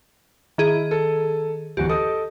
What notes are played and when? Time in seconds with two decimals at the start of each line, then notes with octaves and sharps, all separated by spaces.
0.58 D#3 E4 G#4
0.91 A4
1.77 D1 E2 F#4 G4
1.89 A4 D#5 D#6